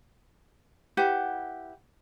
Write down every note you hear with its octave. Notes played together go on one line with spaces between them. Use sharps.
E4 G4 B4 F#5